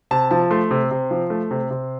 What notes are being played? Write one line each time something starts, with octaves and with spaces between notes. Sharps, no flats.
C3 A5
F3 A5
A3 C6
C3
C3
F3
A3
C3
C3